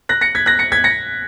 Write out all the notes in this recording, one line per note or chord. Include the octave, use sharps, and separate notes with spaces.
F#6 A#6
A#6 C#7
G#6 B6
F#6 A#6
A#6 C#7
G#6 B6
A#6 C#7